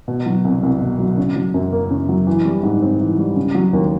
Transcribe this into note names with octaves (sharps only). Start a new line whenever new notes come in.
B2
F#3
C2
C2
B2
F#3
C#3
F#3
F#2
A#3
C#3
F#3
E3
G3
G#2
C4
E3
G3
C#3
F#3
D#2